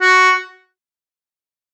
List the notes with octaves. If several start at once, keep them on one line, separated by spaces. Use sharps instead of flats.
F#4